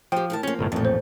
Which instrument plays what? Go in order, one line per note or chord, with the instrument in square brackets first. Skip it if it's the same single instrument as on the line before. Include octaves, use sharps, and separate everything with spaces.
[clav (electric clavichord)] F3 [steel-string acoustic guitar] G4 C5 [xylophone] G5
[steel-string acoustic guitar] A2 A#4 A5
[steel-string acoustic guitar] F3 A#3 [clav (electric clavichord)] C#4
[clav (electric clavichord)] G1 C2 A2
[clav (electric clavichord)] A1 F2 [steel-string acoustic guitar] A#2 A3
[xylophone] C5